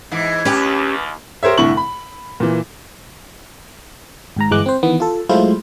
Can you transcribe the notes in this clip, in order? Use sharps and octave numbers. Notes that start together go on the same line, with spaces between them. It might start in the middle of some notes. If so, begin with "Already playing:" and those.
G#2 E3
D#2 C#4 G4 B4
G4 A#4 C5 C#5 E5
C2 A2 D3 E4 C#6 F#7
B5
A#2 E3
G#1 G#2 A#5
G1 E3 G#3 D6 F#6
C4 C5
D#3 E3 B3
F4 A4
F#3 G#3 A3 E4 F4 C5